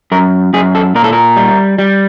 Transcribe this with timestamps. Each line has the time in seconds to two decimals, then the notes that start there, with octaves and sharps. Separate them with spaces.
0.12 F#2 A#4
0.53 F#2 G#4
0.75 A4
0.95 A#2 A#4
1.04 A4
1.12 A#4
1.36 G3
1.78 G3